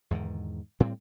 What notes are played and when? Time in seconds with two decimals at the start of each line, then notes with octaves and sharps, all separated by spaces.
0.11 E2 G#2 D3 D#3
0.80 A2 G3 C4